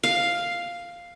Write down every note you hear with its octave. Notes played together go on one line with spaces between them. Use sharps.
F5